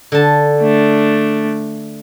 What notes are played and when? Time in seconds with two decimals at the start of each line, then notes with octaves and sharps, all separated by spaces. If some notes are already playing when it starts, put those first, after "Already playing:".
0.12 D3 A5
0.59 A3 D4